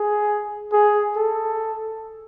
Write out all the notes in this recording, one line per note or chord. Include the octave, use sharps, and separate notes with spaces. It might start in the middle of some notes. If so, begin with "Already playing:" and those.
Already playing: G#4
G#4
A4